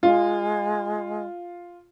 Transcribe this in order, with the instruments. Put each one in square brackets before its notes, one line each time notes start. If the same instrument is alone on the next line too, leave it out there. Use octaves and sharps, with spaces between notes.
[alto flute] G#3 [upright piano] F4